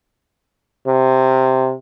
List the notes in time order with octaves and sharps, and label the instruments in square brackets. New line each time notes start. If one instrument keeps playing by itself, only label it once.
[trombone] C3